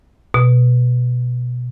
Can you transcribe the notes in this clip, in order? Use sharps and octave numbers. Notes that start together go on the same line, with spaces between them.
B2